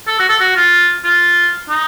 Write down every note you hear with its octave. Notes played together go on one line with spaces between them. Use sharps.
A4
F#4
A4
F#4
F4
F4
D#4